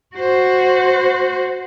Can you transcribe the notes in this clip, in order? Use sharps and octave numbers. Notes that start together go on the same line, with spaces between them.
F#4 C5